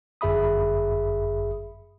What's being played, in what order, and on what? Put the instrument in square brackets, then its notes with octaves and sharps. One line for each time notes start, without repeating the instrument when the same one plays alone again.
[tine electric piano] G1 F#2 G#4 E5 B5 D#6